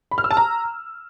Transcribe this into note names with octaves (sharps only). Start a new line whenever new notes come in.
B5
F6
E6
A5
A#5